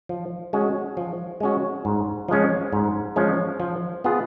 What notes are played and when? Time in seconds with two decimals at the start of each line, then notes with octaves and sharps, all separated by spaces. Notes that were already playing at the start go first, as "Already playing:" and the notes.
0.09 F3
0.53 G#3 C#4 F#4
0.97 F3
1.40 G#3 C#4 F#4
1.85 G#2
2.28 F3 G#3 C#4
2.73 G#2
3.16 F3 G#3 C#4
3.60 F3
4.04 B3 F4 G#4